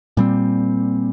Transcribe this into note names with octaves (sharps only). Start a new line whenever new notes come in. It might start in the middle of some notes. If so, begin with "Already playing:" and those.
A#2 G3 C4